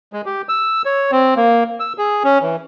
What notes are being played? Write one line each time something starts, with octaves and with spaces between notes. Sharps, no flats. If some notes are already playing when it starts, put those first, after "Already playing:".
G#3
G4
E6
C#5
C4
A#3
E6
G#4
C#4
E3